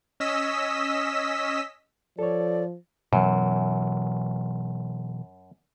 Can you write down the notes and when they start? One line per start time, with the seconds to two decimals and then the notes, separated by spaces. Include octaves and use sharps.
0.20 C#4 D#5 E6 B6
2.19 F3 A4 C#5 D5
3.13 F#2 B2 E3 F#3